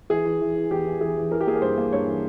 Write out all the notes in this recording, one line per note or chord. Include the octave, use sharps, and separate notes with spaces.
E3 G#4
E3
E3
E3
E2 G4
E3
E3 G#4
E3
E3 A#4
G4
A#3 G#4
A#4
G2 C5
A#3
G2 C#5
E3